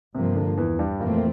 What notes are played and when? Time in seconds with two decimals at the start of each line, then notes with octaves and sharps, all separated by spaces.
0.15 G2 C3 F3 A#3
0.36 D3
0.57 E2 E3
0.79 G2 G3
1.00 F2 A#2 E3 A3 A#3 C4
1.17 A#3